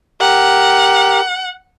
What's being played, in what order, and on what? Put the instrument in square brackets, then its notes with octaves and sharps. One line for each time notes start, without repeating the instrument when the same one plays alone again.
[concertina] G4 A#4 [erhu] F#5